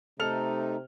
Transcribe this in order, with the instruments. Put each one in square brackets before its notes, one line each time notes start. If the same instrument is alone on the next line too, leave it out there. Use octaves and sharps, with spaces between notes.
[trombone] C3 [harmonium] A3 D#4 [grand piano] A4 F6 F7